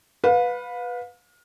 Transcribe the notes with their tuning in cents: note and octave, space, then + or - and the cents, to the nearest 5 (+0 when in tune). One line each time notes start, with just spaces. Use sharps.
B4 +0 F5 +35